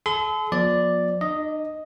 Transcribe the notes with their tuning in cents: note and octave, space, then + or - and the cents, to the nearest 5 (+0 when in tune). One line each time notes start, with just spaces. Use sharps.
A4 -40 C6 -40
F3 +35 B3 -45 D5 +0
D#4 -40 D#5 +0